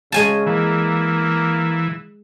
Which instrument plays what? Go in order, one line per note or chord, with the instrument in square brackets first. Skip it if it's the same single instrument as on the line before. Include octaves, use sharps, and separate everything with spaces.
[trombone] C#3 [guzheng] G#3 G#5 A5
[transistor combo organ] E3 [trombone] A#3